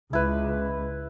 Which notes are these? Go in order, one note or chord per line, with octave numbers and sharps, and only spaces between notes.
C#2 E4 B4